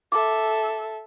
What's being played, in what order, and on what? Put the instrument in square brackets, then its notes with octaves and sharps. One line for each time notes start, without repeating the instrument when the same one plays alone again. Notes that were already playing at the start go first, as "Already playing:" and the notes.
[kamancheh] A4 E5 [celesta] D6